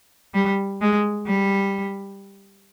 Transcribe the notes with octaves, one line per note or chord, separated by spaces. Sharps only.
G3
G#3
G3